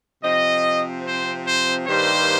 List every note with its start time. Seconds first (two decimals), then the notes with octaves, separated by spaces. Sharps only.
0.23 C3 F3 C4 D#5
1.06 C5
1.47 C5
1.87 G2 D#3 G3 A#3 C5